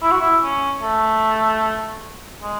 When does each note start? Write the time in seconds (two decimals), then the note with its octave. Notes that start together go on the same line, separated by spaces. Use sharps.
0.02 E4
0.11 F#4
0.21 E4
0.43 C#4
0.82 A3
2.42 G#3